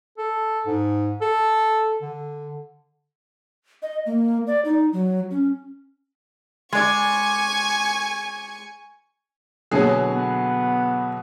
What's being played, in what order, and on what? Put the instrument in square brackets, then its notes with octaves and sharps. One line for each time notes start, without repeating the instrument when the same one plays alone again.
[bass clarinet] A4
G#2
A4
D3
[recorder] D#5
A#3
D5
D#4
F#3
C#4
[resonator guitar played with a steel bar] G#3 D5 [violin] G#5 C#6
[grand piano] B2 D3 F#3 [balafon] A#3 C#5 [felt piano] G#4
[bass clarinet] B3